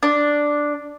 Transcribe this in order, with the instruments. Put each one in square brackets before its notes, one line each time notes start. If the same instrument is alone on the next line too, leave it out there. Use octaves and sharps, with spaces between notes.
[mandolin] D4